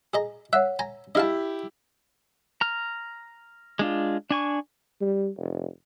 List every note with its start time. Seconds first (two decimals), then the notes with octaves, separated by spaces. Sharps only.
0.14 G#4 D#5 A#5
0.53 C#5 E5 F#5 F#6
0.79 G#5 A#5
1.15 E4 G4 D#5 F5 A5
2.61 A#5 F6
3.79 G#3 D4 F4
4.30 D4 G#5 C#6
5.01 G3
5.37 F1